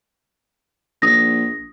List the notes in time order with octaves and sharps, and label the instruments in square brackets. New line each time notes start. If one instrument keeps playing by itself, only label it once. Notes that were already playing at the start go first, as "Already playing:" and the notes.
[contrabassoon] A#1 [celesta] D#6 A#6